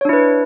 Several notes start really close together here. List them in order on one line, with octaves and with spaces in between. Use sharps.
C#5 D4 E4 B4